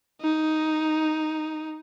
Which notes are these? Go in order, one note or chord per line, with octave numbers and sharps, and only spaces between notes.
D#4